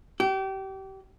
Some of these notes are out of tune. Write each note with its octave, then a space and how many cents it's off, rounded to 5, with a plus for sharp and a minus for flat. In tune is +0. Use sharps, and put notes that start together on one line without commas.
G4 -30